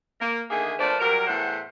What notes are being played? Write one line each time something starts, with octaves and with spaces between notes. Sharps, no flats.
A#3
D3 D#3 A3 A#3 G#4
F3 A3 A#3 B4 C5 D5
F#2 F#3 G3 A#4
E2 A2 A3 C5 F#5